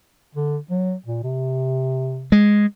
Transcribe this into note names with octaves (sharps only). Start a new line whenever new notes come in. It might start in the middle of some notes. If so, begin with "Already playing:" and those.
D3
F#3
A#2
C3
G#3